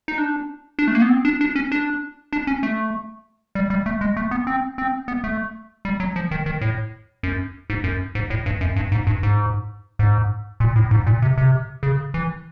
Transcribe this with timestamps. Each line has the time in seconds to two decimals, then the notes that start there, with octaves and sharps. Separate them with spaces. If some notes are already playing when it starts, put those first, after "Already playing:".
0.08 D#4
0.18 D4
0.79 D4
0.88 A3
0.95 A#3
1.02 B3
1.09 C4
1.25 D4
1.41 D4
1.55 C#4
1.72 D4
2.33 D4
2.47 C#4
2.63 A3
3.55 G3
3.70 G3
3.86 A3
4.01 G#3
4.17 A3
4.31 B3
4.47 C4
4.78 C4
5.08 B3
5.24 A3
5.85 G3
6.00 F#3
6.16 F3
6.31 D#3
6.46 D#3
6.61 A2
7.23 F#2
7.70 G#2
7.84 F#2
8.15 G#2
8.30 A2
8.46 G2
8.61 F#2
8.76 G2
8.92 G#2
9.07 G2
9.23 G#2
9.99 G#2
10.60 A#2
10.76 A2
10.91 G#2
11.07 A#2
11.22 C3
11.38 C3
11.83 C#3
12.14 E3